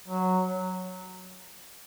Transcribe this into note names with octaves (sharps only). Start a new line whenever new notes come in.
F#3